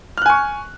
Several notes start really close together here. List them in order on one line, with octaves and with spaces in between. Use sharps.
F6 F#6 G#5 C#6